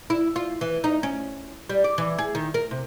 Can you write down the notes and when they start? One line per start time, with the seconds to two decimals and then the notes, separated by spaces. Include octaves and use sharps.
0.10 E4
0.36 F4
0.61 E3
0.84 D#4
1.03 C#4
1.69 G3
1.84 D5
1.98 E3
2.18 G#4
2.35 D#3
2.54 A#4
2.71 C3